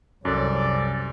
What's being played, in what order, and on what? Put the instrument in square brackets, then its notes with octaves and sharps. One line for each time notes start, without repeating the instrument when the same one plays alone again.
[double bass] C2 [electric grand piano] F#2 [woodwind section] C#4 A4 D5